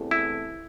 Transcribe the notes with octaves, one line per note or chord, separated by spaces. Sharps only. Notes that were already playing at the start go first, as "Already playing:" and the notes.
Already playing: E2 C3 E3 A3
E4